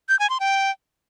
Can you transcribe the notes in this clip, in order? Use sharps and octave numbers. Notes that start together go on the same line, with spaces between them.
G6
G#5
C6
G5